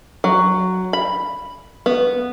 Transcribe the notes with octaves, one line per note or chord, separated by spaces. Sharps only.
F#3
B5
B3